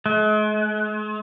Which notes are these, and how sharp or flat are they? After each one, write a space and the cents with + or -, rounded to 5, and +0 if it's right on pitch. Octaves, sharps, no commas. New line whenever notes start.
G#3 +40